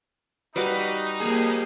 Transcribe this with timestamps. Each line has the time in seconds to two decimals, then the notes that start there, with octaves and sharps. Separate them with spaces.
0.56 G3 A#3 D#4 F#4 B4
1.20 F2 A#3 G4 G#4